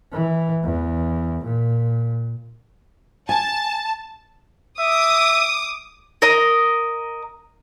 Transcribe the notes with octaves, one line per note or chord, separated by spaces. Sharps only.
E3
E2
A#2
G#5 A5
E5 D6 D#6
A#4 D#5